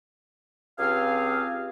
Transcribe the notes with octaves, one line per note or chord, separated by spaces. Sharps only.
C#2 C4 G4 G#4 F5